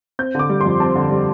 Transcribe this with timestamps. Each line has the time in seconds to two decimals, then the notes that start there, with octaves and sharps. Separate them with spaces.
0.19 C4 G6
0.35 D3 D6
0.49 G3
0.61 F2 C6
0.80 C4 A5
0.96 D3
1.11 G3